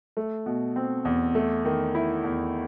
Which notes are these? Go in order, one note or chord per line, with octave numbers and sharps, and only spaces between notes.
A3
B2
C4
E2
A3
D#3
E4
E2